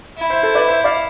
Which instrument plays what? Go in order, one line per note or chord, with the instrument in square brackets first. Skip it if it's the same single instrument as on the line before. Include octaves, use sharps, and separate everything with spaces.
[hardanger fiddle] E4
[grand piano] C5 E5
A4 C5
B4 D5
C5 E5
D5 F5